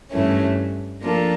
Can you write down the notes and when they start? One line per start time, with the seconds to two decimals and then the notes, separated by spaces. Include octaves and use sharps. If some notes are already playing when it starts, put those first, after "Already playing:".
0.11 G2 E3 A3 C#4
1.01 F3 A#3 D4 F4 A4